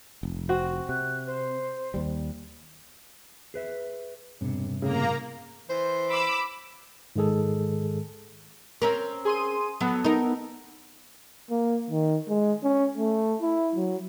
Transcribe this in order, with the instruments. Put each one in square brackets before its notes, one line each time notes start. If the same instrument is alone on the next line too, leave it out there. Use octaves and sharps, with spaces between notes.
[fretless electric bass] F1
[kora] C4 F#4
[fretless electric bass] C3 [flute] F#6
[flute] C5
[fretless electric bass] D#2 G3
[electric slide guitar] G#4 B4 E5
[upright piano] E1 [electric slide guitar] G2 C3
[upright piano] A2 C#3 [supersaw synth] A#3 A#5
[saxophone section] E3 C5
[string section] B5 D6 E6
[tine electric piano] G#2 D#3 G#3 G#4 A4
[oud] C4 C#4 A#4
[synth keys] G#4 C6 D#7
[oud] F#3 [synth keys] B3 A4
[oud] D#4 A#4
[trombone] A#3
D#3
G#3
C#4
A3
E4
F#3